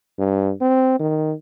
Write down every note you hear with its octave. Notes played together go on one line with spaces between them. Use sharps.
G2
C4
D#3